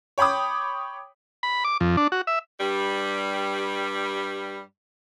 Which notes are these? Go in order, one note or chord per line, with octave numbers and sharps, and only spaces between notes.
C#5 G5 B5 D6 D#6
B5
D6
F2
D4
F#4
E5
G2 G3